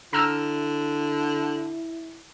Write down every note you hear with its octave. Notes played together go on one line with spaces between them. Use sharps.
D3 E4 A#5 E6 F6